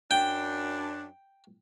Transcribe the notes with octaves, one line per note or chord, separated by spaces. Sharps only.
F#2 D4 G5